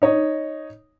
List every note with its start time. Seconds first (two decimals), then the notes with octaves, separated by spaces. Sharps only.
0.02 D#4 C#5 D#5